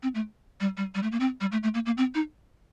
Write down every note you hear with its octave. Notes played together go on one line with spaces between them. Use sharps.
C4
A3
G3
G3
G3
A3
A#3
C4
G3
A3
A3
A#3
A#3
C4
D#4